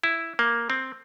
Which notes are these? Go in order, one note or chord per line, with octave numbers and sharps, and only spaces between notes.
E4
A#3
C4